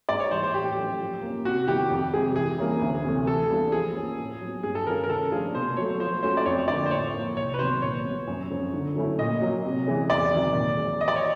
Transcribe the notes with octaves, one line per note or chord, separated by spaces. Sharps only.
G#2 D5
C#5
E3 G3 C5
C5
A2 G4
F#3 A3 C#4
F3
A#3 C#4
C3 F#4
D#3 G3 B3 E4 G4
F2
C3 F3 G#3 G#4
E3 G#4
G3 A#3 C#4 E4
D2
C3 E3 A3
E3 A4
G3 B3 D4 F4
F3 G#4
A#3 C#4
A2
F#3 B3
G2 G#4
A4
D#3 G#3 C#4 F4 A#4
A#4
C#3 A4
F3 A3 D4 F4 G#4
B2 C5
F#3 A3 C#5
F3 C5
A3 C#4 F#4 C5
D5
F2 C#5
D3 F3 A#3 D5
C5
A2 C#5
F3 A#3
C2 C#5
B4
C3 D#3 F#3 B3 C5
A#2 C#5
G3 B3
F#2
C#3 F3 G#3 C4
D3
F#3 A3 C#4 E4
A#2 D#5
F#3 A#3
C3
E3 G#3 C#4
E2 D5
C3 D#3 F#3
A#2
F3 G#3
E3 D#5
D5
C#5